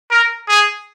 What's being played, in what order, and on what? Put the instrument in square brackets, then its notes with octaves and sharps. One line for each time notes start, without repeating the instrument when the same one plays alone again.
[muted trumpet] A#4
G#4